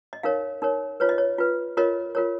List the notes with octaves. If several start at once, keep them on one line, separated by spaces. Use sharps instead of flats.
D#5
D#4 A#4 C#5 F5
D#4 A#4 C#5
F4 B4 C#5
D#5
C#5
F4 B4
F4 A#4 C#5 D#5
F4 A#4 C#5